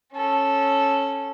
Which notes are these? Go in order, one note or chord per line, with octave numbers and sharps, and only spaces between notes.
C#4 A4